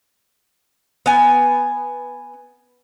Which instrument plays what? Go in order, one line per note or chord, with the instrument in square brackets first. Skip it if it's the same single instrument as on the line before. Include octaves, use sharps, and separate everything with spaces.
[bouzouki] B3 G#5